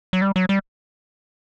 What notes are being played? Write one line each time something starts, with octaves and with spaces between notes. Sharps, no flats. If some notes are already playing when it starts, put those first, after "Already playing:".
F#3
G3
F#3
G3